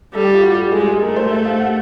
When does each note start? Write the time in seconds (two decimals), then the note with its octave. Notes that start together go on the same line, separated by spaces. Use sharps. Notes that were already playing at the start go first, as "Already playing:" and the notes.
0.14 G3 A4
0.24 G4
0.34 F4
0.43 F#4
0.72 G#3 G#4
0.88 G#4
1.02 A3 A#4
1.16 C5
1.31 E5
1.45 F5
1.60 F#5